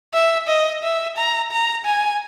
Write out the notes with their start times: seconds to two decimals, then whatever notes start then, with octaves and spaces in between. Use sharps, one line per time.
0.14 E5
0.48 D#5
0.83 E5
1.17 A#5
1.52 A#5
1.86 G#5